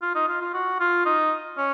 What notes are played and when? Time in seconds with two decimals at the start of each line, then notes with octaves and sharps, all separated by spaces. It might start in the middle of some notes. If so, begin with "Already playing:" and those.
0.02 F4
0.15 D#4
0.28 F4
0.41 F4
0.54 F#4
0.80 F4
1.06 D#4
1.58 C#4